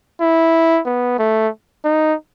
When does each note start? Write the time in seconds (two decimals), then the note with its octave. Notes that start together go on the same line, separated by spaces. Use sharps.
0.21 E4
0.85 B3
1.19 A3
1.85 D#4